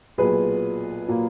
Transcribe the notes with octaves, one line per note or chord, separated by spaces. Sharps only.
B1 A#2 F#3 B3 G#4 B4
A#2 F#3 A#3